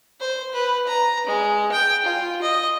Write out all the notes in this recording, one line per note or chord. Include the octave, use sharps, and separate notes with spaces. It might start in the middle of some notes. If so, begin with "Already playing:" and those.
C5
B4
A#5
G#3
G5
F4
D#5